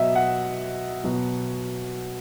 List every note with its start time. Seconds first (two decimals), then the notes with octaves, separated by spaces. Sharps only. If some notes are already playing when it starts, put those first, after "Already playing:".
Already playing: B2 F#3 D#5 E5
0.16 F#5
1.04 B2 F#3